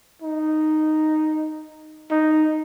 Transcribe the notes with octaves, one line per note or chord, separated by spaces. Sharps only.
D#4
D#4